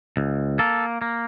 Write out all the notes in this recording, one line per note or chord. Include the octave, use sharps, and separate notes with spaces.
C#2
A#3 A4
A#3